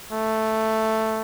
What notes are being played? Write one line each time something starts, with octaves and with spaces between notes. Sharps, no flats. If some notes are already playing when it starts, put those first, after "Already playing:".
A3